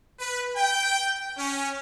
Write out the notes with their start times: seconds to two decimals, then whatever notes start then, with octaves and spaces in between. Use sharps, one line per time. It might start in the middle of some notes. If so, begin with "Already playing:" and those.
0.20 B4
0.56 G5
1.37 C#4